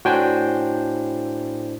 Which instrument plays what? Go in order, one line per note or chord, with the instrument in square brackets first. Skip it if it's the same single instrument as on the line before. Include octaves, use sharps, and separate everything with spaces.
[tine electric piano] A2 D4 C5 [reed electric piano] F#4 G5 G#5